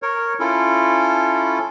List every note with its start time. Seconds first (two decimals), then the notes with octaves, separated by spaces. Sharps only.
0.02 A#4 C#5
0.40 C#4 E4 F4 A4